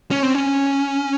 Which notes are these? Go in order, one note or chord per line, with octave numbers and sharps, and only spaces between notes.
C#4
C4
C#4